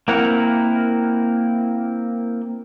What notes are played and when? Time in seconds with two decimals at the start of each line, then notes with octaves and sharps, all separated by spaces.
0.08 A#3 C4 E4 A#4 F#5